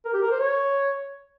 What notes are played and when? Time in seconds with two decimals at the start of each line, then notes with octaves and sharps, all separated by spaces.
0.05 A#4
0.14 G4
0.22 A#4
0.31 C5
0.40 C#5